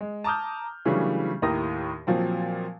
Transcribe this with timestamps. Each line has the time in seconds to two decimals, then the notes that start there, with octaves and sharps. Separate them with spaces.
0.01 G#3
0.24 A5 A#5 D6 D#6 F6 G6
0.85 C#3 E3 F#3 G3 A3 D4
1.42 D#2 A2 G4 A#4 D#6 A#6
2.07 A#2 F3 F#3 C4